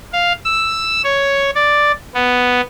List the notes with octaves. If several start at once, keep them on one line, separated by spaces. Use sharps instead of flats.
F5
E6
C#5
D5
B3